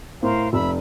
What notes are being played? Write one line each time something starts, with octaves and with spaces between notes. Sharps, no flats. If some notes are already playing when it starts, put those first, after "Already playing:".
A2 A#4 C5 F5
F1 E5 B5 E6